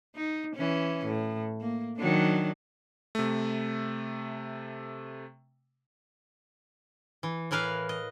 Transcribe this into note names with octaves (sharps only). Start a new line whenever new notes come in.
D#4
E3 C#4
A2
A#3
D#3 F#3 D4
C3 A3
E3
A2 E3 A#4 B4 F5
D#5